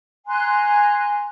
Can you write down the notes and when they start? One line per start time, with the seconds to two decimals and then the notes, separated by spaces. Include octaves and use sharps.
0.27 G#5 A#5 C6 F#6